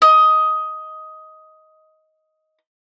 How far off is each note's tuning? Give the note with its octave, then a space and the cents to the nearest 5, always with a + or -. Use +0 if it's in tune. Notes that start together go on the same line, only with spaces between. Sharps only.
D#5 +10